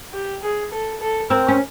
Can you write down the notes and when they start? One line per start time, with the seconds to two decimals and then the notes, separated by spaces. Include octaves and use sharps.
0.13 G4
0.42 G#4
0.71 A4
1.00 A4
1.30 C4 A#4
1.48 C#4